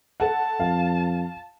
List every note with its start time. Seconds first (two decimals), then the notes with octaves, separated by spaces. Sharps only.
0.20 A4 F#5 A5
0.60 F2 F5